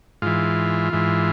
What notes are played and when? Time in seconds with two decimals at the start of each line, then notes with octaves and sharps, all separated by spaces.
0.22 G#2 E3 F4
0.93 G#2 E3